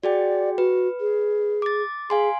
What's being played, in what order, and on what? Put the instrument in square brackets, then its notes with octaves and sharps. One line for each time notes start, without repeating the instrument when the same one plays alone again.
[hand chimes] F#4 G#4 G5 [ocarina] D5
[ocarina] F#4 [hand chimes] B4
[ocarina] G#4
[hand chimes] D6 A6
[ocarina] G#4 [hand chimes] F5 G#5 C6